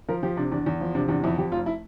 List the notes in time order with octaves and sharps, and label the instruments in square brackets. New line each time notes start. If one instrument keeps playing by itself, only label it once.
[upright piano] F3 A#4
F3 G4
C3 D4
E2 D4
E2
F3
C3 D4
E2 D4
F2 E4
F2 G4
F1 F4
E4